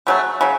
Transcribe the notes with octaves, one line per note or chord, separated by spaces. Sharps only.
C#3 F#3 A3
C#3 F#3